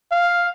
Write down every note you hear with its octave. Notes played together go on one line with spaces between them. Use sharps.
F5